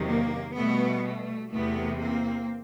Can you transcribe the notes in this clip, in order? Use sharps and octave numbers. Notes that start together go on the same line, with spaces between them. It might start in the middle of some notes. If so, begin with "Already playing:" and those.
Already playing: E2 C3 D#3 F#3
A#3
B2 G3 A3 B3
A3
E2 C3 E3 A3 B3
A#3 C4